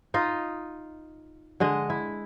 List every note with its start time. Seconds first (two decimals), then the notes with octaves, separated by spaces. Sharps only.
0.14 D#4 F4 D#5
1.60 D3 G#3 D#5
1.90 E4